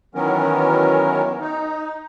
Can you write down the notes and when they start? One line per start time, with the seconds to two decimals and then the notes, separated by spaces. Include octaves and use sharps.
0.15 D#3 E3 F#3 B3 C#4 A#4
1.40 D#4